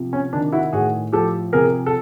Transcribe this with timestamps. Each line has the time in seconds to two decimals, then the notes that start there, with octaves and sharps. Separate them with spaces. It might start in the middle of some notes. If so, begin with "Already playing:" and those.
Already playing: C3 F3
0.13 C#4
0.33 D#3 D4
0.52 E4 F#4
0.73 A2 F#4 G#4
1.12 F3 G4 A4
1.53 C3 G#4 A#4
1.86 A4